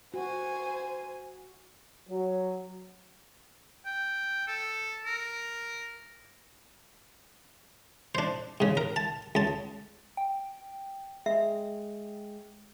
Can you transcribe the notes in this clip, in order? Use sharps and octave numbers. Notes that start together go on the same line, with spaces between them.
F#4 C5 G#5
F#3
G5
A4
A#4
D4 C5
G#2 C#3
A#4
A5
C#2 A5
G5
G#3 G#4 E5